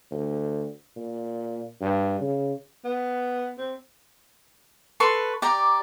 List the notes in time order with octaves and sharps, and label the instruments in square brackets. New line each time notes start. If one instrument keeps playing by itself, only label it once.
[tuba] D2
A#2
G2
C#3
[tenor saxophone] B3
C4
[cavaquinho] A4 B4 C6 C#6
G4 D5 A#5